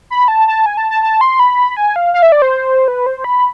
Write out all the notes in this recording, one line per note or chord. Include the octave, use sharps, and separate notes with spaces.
B5
A5
A5
G#5
A5
A5
A5
C6
B5
G#5
F5
F5
E5
D5
C5
B4
C5
B5